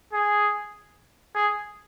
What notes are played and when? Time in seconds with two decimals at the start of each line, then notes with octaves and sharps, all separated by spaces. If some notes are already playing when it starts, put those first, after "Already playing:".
0.13 G#4
1.35 G#4